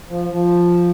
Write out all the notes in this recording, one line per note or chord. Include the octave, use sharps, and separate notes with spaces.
F3
F3